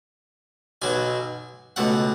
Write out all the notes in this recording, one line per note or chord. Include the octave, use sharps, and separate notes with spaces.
B1 B2 F#3 G#5
C#2 B2 A3 F#5